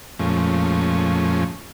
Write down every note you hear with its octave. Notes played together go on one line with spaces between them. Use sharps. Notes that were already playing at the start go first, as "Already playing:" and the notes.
F2 A#2 F3 G#3 A3 C#4